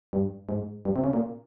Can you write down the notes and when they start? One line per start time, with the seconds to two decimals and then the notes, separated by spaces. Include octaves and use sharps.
0.13 G2
0.49 G#2
0.85 G2
0.96 C3
1.04 C#3
1.13 A#2